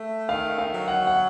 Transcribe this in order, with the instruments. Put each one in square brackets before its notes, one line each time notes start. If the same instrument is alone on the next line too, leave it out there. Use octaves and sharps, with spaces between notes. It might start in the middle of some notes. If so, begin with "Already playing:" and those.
Already playing: [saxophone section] A3
[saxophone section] D#3 [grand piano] F5
[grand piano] F5
[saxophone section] F#3
[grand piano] F#5
F#5